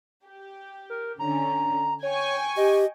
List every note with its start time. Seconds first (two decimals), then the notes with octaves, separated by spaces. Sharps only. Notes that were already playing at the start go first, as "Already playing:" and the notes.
0.24 G4
0.90 A#4
1.19 D3 C#4 A#5
2.03 C#5 G5 G#5 C#6
2.57 G4 D#5